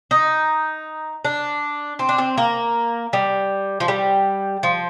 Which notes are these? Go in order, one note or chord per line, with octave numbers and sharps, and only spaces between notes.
D#4
D4
C4
D4
C4
A#3
G3
F3
G3
F3